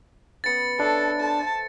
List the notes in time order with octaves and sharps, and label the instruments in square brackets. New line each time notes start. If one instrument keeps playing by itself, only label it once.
[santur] B3 C#4 E6 [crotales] A6 C#7
[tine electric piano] D4 [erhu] A4 [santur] C#5 E5 G#5
[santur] A4 C5 [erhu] A5